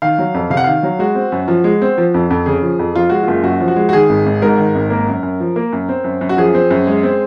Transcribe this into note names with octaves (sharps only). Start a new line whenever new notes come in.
D#3 F5
F#3
F2
C3 F5
F#5
D#3 F5
F#3
G#3 F#4
C4
F#2
F3
G#3
C4
F3
F2
F2
C#3 G#4
F3
F2
F3 F4
G#3 F#4
F#1 F4
F#2 F#4
F3
F#4
G#3
F#4
D#3 G#4
G#1
G#1
G#2 A#4
D#3
G#1
A#3
F#2
F#2
F3
A#3
F#2
C4
F#2
F#2
F#4
F3 G#4
C4
F#2
G#3
C4